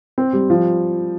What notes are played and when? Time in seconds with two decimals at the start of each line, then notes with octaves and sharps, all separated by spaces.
0.18 C4
0.33 G3
0.50 F3